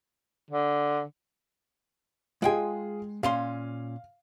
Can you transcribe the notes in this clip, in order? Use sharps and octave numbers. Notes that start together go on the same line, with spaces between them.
D3
G#3 F4 G#4 G5 G#5
A#2 C#4 F5 C6